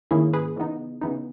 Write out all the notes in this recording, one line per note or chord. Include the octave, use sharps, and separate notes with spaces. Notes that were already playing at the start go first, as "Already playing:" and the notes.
G#2 D#3 A#3 C#4 E4 G#4
G#4 B4
C#3 E3 B3 D#4
C#3 E3 B3 D#4